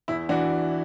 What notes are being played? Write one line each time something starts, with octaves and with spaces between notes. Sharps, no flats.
E2 E4
E3 D4 F#4